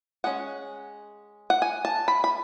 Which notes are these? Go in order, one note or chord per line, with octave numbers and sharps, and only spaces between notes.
G#3 C#4 F#5
F#5
G#5
A5
B5
B5